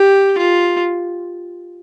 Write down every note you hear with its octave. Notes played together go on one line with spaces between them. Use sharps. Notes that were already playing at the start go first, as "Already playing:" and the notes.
Already playing: G4
F4